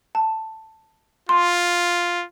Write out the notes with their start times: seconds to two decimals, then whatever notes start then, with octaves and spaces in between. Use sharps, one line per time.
0.15 A5
1.29 F4 C6